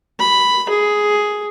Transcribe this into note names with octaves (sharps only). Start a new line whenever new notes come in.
B5
G#4